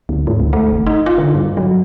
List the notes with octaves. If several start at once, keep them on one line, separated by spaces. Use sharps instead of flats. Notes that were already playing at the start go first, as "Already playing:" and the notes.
D2
G#2
D2
A3
G1
D#4
F4
D3
G2
F#3